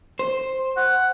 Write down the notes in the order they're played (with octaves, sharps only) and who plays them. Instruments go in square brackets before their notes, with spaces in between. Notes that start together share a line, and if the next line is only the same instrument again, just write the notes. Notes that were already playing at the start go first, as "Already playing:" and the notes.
[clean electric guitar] C5
[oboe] F#5